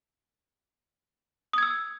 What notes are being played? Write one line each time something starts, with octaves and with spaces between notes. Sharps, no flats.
D#6 E6 G#6